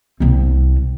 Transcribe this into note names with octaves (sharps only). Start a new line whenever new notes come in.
C2 C4